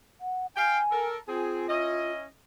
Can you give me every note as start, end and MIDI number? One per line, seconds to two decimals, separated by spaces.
0.21 0.46 78
0.56 0.77 77
0.56 0.77 79
0.56 1.06 80
0.91 1.18 69
0.91 1.18 70
1.28 1.66 60
1.28 2.11 65
1.28 1.66 68
1.69 2.25 61
1.69 2.25 64
1.69 2.25 75